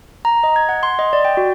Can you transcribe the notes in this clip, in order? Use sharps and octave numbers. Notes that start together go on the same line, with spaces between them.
A#5
D#5
G#6
F#5
C6
D#5
D5
G5
F#4